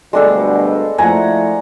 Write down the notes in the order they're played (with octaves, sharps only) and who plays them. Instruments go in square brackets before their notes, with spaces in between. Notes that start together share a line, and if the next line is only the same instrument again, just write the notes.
[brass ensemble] D2 G2 B2 [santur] G#3 D4 A4
[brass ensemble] F3 A3 E4 [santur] F#5 A#5 [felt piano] G#5